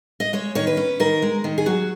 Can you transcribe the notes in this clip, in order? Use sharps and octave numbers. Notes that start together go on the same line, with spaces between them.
D#5
G#3 C#5
D#3 C#5
B4
C#4
D#3 A#4
G#3
D#3
G#4
F#3 F#4